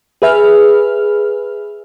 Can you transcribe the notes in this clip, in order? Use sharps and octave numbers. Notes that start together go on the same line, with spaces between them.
G#4 B4 E5 F6